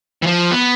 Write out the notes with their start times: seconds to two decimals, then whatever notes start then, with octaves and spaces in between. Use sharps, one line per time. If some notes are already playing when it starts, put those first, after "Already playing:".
0.23 E3
0.27 F3
0.51 B3